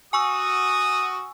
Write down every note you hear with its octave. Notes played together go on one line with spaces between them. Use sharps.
F#4 G#5 C#6 D#6 E6